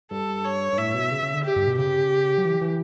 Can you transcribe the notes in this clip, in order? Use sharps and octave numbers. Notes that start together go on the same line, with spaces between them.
G2 A4
C#5
G2
A2 E5
B2
C#3
C#3
D3
G4
G2
B2
C#3 G4
F#3
E3
E3